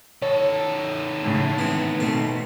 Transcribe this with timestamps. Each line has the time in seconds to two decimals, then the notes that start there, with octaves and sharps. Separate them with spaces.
0.22 D#3 A4 C#5
1.22 A2 C#3
1.59 E3 B3 C4
2.00 B2 A3 C4